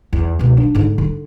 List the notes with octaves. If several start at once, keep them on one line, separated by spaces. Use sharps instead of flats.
E2
C#2 B2
D4
G#2 D3
D3